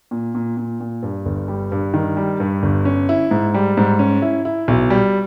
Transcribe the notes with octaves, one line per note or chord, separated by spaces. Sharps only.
A#2
A#2
A#2
A#2
G2
G1
G3
G2
D#3
G3
G2
G1
C#4
E4
G#2
G3
G#2
C#4
E4
E4
B1
G3